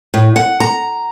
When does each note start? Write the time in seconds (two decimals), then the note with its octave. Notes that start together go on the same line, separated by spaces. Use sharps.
0.14 A2
0.36 F#5
0.60 A#5